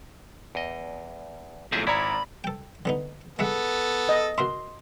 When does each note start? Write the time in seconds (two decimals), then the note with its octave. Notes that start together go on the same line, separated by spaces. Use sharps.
0.55 E2 D#5
1.72 B1 F2 A2 C4 G#4 E5
1.87 G#1 E4 C#5 D5 A#5 B5
2.44 A4 G5
2.85 D3 B3 D#4
3.39 G#3 B3 A4 E5 F#5
4.09 D#5
4.38 F#4 A#4 E5 C6